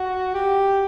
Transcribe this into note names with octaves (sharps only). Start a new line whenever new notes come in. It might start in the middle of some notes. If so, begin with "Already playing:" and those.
Already playing: F#4
G4